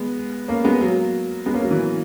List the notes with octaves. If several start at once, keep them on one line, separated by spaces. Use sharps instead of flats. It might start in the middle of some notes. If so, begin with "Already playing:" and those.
Already playing: G#3 B3
A#3 C#4
G#3 B3
F#3 A#3
G#3 B3
A#3 C#4
F#3
E3